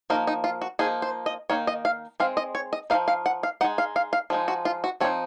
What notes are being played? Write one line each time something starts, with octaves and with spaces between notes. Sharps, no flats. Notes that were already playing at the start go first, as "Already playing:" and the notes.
F3 A#3 D#4 A#4
D#4
F4
F#4
F3 A#3 D#4 G#4
C5
D#5
D#3 A#3 D#4 C#5
D#5
F5
G#3 C4 F5
D#5
C#5
D#5
F3 A#3 D#4 F5
F5
F#5
F5
G#3 D#4 F#5
F5
F5
F5
F3 G#3 D#4
F#4
F4
F#4
F3 C4 D#4 C#5